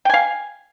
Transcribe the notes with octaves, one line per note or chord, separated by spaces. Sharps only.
F5 G5 G#5